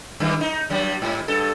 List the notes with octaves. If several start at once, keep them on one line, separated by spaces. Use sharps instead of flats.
F#2 D#3 E3
D#4
G2 F#3 G3
G#2
G2 A4